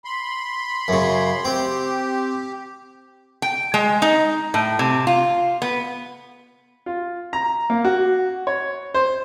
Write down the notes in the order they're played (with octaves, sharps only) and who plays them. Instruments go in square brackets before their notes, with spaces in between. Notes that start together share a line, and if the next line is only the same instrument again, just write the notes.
[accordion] B5 C6
[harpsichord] F#2 C#3
[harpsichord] C4 [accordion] G4
[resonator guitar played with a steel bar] G5
G#3
D#4
A2
C3
F4
B3
[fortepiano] F4
A#5
A#3
F#4
C#5
C5